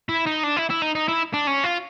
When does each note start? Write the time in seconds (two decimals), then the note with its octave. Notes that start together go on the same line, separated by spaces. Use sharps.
0.09 E4
0.27 D#4
0.44 D4
0.57 E4
0.70 E4
0.82 D#4
0.95 D#4
1.08 E4
1.34 D4
1.47 C#4
1.64 F4